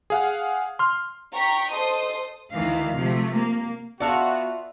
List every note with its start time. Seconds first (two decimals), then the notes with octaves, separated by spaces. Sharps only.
0.10 G#4 F5 F#5
0.79 C6 F6
1.33 G5 A#5 C#6 B6
1.70 A4 C5 D#5 A5 C6 D#6
2.53 D2 D#3 E3 F5
2.95 C3 F3 A3
3.34 A#3
4.00 B3 F4 F#4 D5 E5 F#5 A5